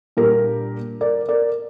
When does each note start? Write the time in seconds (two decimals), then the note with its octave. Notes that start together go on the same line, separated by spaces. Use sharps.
0.17 A#2 G3 D4 G4 A#4
1.01 A#4 D5
1.29 A#4 D5